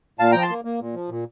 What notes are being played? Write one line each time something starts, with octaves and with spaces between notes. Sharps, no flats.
A#2 F5 A5
F3 G5 A#5
A5 C6
A#3
A#3
A#2
F3
A#2